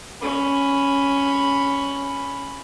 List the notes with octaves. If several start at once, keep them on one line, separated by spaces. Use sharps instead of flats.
C#4 B5